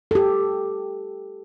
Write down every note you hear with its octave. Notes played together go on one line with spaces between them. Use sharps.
G4 A4